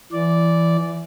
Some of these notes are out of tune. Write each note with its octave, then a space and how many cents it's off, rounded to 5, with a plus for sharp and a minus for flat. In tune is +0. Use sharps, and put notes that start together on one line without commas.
E3 +20 D5 -10